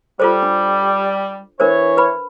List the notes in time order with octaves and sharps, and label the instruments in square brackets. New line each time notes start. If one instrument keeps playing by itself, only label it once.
[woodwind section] G3 [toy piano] F4 A4 C5
[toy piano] D4
[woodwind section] E3 C#5 [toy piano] D4 A#4 C5
[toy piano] B4 B5